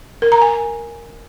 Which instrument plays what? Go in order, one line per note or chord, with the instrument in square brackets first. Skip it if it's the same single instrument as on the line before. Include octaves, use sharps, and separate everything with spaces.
[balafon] A#4
A#5
G#5